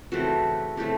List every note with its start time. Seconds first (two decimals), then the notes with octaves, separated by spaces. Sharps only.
0.12 C#3 E3 A3 C4 F#4
0.77 C#3 E3 A3 C4 G4